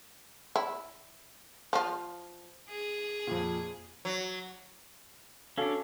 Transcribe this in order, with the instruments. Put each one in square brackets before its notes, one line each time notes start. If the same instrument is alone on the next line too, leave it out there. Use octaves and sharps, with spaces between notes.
[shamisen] E4
F3 F4
[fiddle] G#4
[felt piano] F2 A#2
[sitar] F#3
[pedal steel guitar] C#4 D4 [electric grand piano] F#4 A4 F5